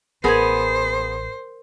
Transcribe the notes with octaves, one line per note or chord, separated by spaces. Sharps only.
A1 B3 G#4 A#4 C5 G#6